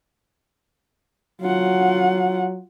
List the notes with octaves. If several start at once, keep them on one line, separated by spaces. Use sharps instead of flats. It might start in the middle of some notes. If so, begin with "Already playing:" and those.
F#3 F4 F#5